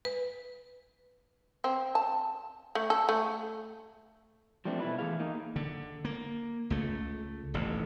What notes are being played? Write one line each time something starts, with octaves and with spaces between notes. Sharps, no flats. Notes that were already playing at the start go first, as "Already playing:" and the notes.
B4
C4
A5
A3
A4
A3
F3 G3 A3 C4 D4
B2 E4 B4
E3 F3 A3 G#4 F5
A#3 D#4
D3
A#3
C#2 A3
D#1 A1 D#2